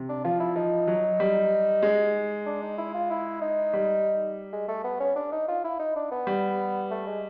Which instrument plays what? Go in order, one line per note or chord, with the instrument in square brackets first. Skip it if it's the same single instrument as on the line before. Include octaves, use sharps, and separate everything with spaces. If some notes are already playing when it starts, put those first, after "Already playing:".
Already playing: [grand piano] C3
[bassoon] D4
[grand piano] F3 [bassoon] F4
[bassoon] E4
[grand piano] F3 [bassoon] D#4
[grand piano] F#3
G3
G#3
[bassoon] D4
D#4
E4
F4
E4
D#4
[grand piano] G3
[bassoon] G#3
A3
B3
C#4
D4
D#4
F4
E4
D#4
D4
B3
[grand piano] G3
[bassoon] A3
G#3